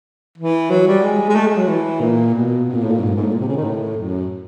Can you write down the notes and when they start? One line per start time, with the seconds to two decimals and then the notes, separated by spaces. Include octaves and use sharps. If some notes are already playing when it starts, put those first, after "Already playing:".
0.38 E3
0.70 F#3
0.87 G3
1.02 G#3
1.29 G#3
1.35 A3
1.47 G#3
1.57 F#3
1.68 E3
2.00 A#2
2.34 B2
2.69 B2
2.74 A#2
2.83 A2
2.91 A#2
2.99 G#2
3.07 G2
3.15 G#2
3.24 A2
3.32 A#2
3.40 C3
3.48 C#3
3.56 D#3
3.64 A2
3.97 F#2